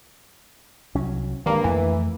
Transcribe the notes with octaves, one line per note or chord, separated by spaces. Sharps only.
C2 F#3 C#4
G2 D#3 G#3 A#3
F2 E3 A3